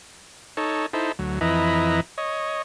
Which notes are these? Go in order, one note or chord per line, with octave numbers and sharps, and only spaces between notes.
D#4 A4 C#5
D#4 E4 A4 C5
D2 F#3
F2 E3 E4 B4 D#5 A#5
C#5 D#5